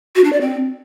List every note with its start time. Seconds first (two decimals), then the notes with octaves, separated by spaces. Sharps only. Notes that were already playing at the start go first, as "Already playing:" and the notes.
0.16 F#4
0.24 D4
0.33 D5
0.41 C4